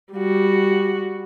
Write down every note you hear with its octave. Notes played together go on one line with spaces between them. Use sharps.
G3 F#4